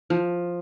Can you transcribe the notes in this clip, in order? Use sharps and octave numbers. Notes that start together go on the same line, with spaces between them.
F3